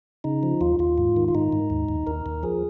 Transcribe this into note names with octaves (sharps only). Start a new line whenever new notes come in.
C#3 D#4
F3
D#2 F4
D#2 F4
G#2
D#3
F4
G#2 D#4
G#2
D#2
D#2
D#2 A#4
D#2
F3 G#4